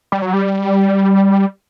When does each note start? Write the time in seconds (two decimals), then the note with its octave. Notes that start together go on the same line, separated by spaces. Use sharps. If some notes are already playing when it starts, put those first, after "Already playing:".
0.12 G3
0.22 F#3
0.33 G3